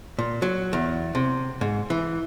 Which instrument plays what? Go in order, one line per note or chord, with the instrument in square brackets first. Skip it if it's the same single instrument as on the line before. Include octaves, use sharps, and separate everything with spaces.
[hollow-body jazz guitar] A#2
F#3
E2
C3
G#2
E3